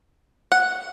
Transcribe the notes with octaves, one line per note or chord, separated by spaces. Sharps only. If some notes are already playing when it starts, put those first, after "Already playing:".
F#5